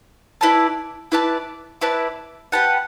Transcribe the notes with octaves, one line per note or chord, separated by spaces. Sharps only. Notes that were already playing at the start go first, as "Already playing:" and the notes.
E4 B4 D5 A5
E4 B4 D5 A5
E4 B4 D5 A5
G4 B4 F#5 A5